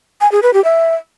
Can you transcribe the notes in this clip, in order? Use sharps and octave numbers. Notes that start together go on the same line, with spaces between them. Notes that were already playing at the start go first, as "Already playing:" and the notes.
G#5
G#4
B4
G4
E5